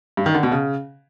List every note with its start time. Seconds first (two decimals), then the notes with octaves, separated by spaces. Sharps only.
0.17 G2
0.26 D#3
0.35 D3
0.43 B2
0.52 C#3